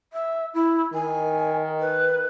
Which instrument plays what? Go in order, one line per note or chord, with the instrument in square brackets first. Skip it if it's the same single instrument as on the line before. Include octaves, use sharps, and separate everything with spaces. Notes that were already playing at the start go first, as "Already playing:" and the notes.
[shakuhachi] E5
E4
[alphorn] D#3 [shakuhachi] G#5
[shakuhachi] B4